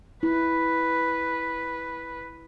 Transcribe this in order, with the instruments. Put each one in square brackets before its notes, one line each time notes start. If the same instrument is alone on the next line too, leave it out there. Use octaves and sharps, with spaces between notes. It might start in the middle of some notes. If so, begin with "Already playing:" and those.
[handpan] E4 [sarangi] B4